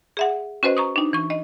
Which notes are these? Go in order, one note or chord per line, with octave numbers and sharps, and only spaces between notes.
G#4 E5 F#5
C#4 F#4 B4 C5 D#5
A#5 C#6 D#6
D4 D#4
E3 C#6
D#5